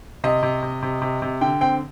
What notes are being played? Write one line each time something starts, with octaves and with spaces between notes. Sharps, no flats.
C3 D#5
C3
C3
C3
C3
C3
D3 G5
C4 G5